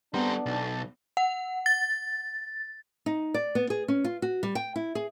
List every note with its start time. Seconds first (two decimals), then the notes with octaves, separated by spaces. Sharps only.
0.14 G3 B3 C4 D4 A4 A#5
0.46 B1 A4
1.17 F#5
1.66 A6
3.06 D#4
3.34 D5
3.55 B3
3.70 G#4
3.88 C#4
4.04 F4
4.22 F#4
4.43 G3
4.55 G5
4.76 E4
4.95 G#4